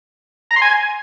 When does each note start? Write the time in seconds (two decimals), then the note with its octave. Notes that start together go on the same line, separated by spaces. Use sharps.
0.51 A#5
0.56 C6
0.62 G#5